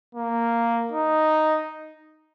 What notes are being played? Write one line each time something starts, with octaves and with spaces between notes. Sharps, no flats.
A#3
D#4